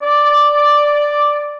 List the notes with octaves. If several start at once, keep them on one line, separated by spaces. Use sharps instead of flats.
D5